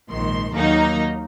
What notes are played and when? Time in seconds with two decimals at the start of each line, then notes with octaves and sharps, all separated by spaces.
0.11 A#1 G#2 D#3 C6
0.54 D#2 D#3 F#3 A#3 D#4 A#5